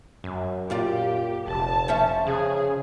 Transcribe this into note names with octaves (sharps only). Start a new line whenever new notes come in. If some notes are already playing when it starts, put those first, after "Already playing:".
F#2
A#2 F4 G4 D5
F1 A5
F3 C#4 E5
C#3 G#4